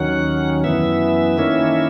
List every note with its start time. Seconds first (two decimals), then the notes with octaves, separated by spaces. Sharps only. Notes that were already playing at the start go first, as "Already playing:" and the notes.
Already playing: D#2 D#3 F#3 C#4 F#5
0.64 F#2 E3 B3 E5
1.38 D#3 A#3 C#4 E4